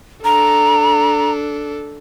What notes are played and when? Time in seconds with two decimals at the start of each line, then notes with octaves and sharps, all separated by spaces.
0.25 D4 A4 A#5